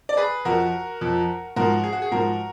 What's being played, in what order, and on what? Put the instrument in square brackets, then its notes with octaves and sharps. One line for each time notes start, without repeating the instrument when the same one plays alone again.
[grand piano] D5
G#4 B4
F2 F3 F#4 A#4
F2 F3
G#2 F3 F#4 A#4
G#4
F#4
G#4
G#2 F3 F#4 A#4